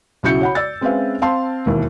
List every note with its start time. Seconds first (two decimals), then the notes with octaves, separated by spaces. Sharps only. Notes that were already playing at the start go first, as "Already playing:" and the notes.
0.23 B1 C#3 E4 F#4 G6 C#7
0.41 C#5 F#5 B5
0.55 D5 E6 A6
0.81 G#3 C4 C#4 B4 E5 F5
1.22 C4 F5 A5 C6
1.66 E1 D#2 E4